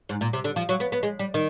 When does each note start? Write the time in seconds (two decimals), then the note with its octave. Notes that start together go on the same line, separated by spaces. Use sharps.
0.09 G#2
0.21 A#2
0.33 C3
0.44 D3
0.56 F3
0.69 F#3
0.80 B3
0.92 B3
1.03 G#3
1.19 G3
1.34 D#3